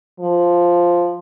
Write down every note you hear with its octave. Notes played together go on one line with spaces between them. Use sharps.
F3